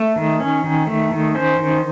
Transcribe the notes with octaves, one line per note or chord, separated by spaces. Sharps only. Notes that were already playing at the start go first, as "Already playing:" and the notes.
Already playing: A3
D#3
C#4
D#3
A3
D#3
C#4 C5
D#3